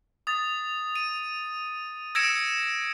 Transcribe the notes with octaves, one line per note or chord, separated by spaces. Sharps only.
D#6 A6
D#7
E6 G#6 A#6 C#7 D7 E7